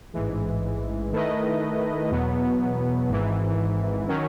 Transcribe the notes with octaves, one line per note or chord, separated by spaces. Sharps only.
A1 G#2 E3 G#3
D#3 A3 E4 B4 D#5
E2 B2 F#3 B3
G#1 G#2 E3
D#3 F#3 C#4